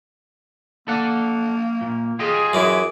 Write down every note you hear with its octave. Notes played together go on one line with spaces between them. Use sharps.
A#3 A4 D5 F#5
A#2
F4 G4 G#4 D#5
F#2 E3 D6